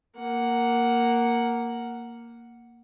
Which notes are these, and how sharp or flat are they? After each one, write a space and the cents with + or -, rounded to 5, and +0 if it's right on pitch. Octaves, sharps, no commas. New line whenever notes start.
A#3 +0 F#5 +0